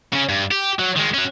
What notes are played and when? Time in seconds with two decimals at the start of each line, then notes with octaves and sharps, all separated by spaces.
0.13 C#3 C#4
0.29 G2
0.51 G4
0.79 F#3
0.96 D#3 G#3
1.14 C#4 F#4